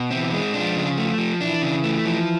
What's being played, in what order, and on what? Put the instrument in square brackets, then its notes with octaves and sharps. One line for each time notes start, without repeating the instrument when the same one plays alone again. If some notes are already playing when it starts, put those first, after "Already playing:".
Already playing: [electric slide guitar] B2
[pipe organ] E3 E4 [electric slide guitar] C4
[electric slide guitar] G#3
[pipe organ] F3 F4 [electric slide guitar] D4
[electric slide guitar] C#3
A3
F3
[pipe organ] E3 E4 [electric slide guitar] D4
[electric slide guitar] C#3
A3
F3